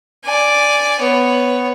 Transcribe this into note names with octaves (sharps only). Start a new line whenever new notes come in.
D5 G#5
B3 C#5